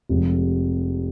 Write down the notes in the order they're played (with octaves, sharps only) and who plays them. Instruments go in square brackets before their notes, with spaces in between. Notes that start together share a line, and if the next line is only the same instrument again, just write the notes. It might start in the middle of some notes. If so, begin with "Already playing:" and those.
[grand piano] F1 F2 C3 F3 G#3